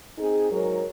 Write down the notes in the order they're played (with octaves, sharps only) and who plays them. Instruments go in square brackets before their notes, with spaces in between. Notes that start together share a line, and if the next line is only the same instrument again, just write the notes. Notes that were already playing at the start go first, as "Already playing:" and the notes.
[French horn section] C4 D#4 G#4
G#2 F#3 G#4 A#4 C#5